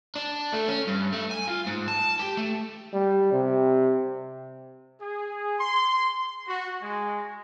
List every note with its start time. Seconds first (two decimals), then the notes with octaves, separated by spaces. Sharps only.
0.15 D4
0.52 A3
0.68 C#4
0.87 G2
1.12 A3
1.31 G#5
1.48 F4
1.67 G#2
1.88 A5
2.19 G4
2.37 A3
2.93 G3
3.32 C3
5.01 G#4
5.59 C6
6.48 F#4
6.82 G#3